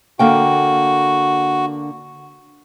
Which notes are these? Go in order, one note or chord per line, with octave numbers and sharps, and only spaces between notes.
D3 A#3 F#4 G5